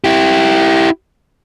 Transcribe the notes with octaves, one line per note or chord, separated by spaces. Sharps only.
E4 G4